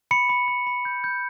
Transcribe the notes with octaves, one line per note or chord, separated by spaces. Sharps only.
B5 C#7
B5
B5
B5
G6
G6